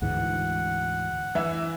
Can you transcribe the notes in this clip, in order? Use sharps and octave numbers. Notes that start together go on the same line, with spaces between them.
D2 G#2 E3 F#5
E3 E4